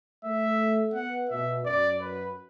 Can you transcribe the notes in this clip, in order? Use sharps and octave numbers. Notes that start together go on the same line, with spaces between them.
A3 E5
B3 F#5
B2 E5
F#2 D5
B4